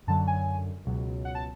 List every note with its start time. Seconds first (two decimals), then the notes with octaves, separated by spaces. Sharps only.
0.07 F#2 D3 F#3 A5
0.27 G#5
0.85 C#2 B2 F#3
1.25 F#5
1.35 A5